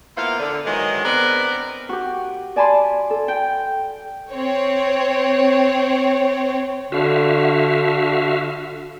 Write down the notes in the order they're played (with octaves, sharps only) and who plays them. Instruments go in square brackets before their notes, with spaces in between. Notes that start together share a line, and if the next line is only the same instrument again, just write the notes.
[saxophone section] A#3 B3 E4 F4 C5 F5
D3
G#2 D#3 E3 F#3 G#3
B3 C4 D4 A#4 B4
[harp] F#4 G4
D5 G#5 A5 B5 C6
A4
G5
[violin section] C4 C#5
[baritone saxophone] D3 [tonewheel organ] F#4 E5 F5